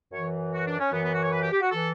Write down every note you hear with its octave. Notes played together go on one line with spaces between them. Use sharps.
F#2 E3 C#5
F#4
D4
C#4
F#2 E3 B3
B3
F#4
C#5
B4
G4
G4
F#4
E3 A4